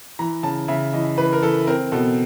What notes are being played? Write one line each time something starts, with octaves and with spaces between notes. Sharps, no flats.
E3 A#5
C#3 A5
C#3 E5
E3 D#5
E3 B4
A#4
E3 A4
C4 A#4
B2 A4